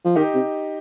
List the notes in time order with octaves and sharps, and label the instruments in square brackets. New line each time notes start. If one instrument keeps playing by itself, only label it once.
[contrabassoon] F3
[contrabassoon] D#3 [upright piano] D#4 G4
[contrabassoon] C3